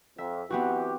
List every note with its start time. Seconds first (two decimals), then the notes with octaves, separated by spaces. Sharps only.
0.18 F2 E5
0.50 E3 B3 C4 F#4 G4